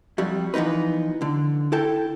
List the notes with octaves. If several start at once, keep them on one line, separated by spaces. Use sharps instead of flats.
F2 F#3 G3
E3 F3 B3 D#4 B4
D3
E4 A4 G5